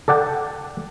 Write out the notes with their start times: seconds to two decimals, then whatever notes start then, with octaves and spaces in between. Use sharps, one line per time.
0.08 A4 D5 F#5 G5 A5